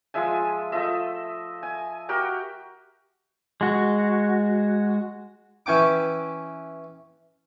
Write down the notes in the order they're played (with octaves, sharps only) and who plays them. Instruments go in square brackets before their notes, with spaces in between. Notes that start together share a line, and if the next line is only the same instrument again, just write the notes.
[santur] F3 G#3 E5 G#5
F3 A3 D#5 E5
G#5
F#4 G4 A#4 G5
[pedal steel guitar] G#3 F#4
[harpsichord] E3 C#4 G5 D6